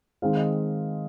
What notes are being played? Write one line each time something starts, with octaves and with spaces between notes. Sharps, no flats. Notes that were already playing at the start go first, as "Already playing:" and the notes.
D#3 G#3 C4 F5
D#5